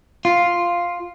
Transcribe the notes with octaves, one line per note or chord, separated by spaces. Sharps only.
F4